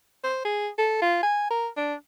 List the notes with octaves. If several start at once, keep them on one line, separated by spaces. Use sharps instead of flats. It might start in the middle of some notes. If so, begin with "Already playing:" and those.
C5
G#4
A4
F4
G#5
A#4
D4